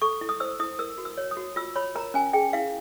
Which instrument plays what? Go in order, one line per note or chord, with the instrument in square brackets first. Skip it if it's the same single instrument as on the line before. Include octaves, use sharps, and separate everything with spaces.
[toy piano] A4 C#6
E4
D#6
C5 E6
E4 D#6
A#4 E6
F#4
E6
C#5
D#6
F#4
F4 E6
C#5 B5
A#4 A#5
C#4 G#5
G#4 G5
E4 F5